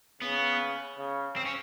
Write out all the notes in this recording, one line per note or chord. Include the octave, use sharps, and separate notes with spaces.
C#3 B3
C#3
C4
C#4